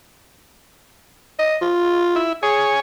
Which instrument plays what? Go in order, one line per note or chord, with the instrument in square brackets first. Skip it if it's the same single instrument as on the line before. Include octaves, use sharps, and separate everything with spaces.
[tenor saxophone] D#5
F4
[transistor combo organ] E4
[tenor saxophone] G#4 [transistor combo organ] C#5 G#5